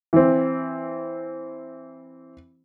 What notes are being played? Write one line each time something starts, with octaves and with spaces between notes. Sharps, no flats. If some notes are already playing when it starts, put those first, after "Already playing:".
E3 C4